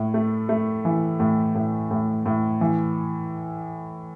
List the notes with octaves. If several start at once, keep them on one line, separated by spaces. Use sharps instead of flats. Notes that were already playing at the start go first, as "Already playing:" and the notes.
Already playing: A2
A3
A3
E3
A2
A2
A2
A2
E3